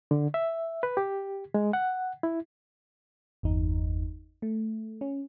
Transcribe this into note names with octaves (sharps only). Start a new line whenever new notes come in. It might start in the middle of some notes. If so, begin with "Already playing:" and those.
D3
E5
B4
G4
G#3
F#5
E4
G1 E2 D#4
A3
C#4